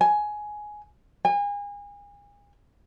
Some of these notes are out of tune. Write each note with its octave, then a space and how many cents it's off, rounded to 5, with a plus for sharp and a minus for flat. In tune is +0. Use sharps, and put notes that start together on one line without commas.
G#5 +10
G#5 -35